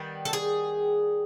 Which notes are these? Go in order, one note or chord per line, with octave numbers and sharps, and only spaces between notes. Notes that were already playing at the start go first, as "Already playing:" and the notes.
Already playing: D#3 G3 B3
A4
G#4